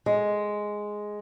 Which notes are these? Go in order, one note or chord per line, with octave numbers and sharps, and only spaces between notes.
G#3